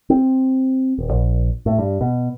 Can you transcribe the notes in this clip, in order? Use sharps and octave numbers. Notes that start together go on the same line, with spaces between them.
C4
D#1
A#1
A2
G2
B2